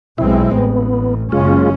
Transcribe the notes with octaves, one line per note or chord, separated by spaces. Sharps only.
B1 G#3 C4 E4
A1 B3
F#1 C#3 G#3 C#4 F4